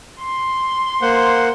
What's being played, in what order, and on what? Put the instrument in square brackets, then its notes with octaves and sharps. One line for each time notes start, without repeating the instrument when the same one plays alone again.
[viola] C6
[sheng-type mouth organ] A#3 C5 F#5